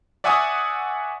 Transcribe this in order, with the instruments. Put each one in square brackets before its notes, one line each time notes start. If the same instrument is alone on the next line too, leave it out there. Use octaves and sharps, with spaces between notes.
[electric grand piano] D5 E5 F#5 G#5 C#6 D#6